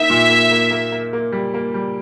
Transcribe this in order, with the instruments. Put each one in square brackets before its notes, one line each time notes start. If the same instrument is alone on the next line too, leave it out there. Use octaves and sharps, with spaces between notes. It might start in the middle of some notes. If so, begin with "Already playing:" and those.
Already playing: [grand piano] A#3 D#4 [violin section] E5
[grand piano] A#2
A#3
A#3
A#3
A#3
A#3
G3
A#3
G3